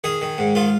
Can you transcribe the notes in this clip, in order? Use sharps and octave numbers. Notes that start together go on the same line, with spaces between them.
D#3 G#4
D#3
G#2
D#3 F4